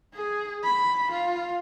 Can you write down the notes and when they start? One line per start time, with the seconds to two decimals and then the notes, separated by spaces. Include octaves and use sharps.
0.14 G#4
0.63 B5
1.11 F4